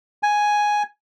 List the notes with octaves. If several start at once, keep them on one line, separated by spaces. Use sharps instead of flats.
G#5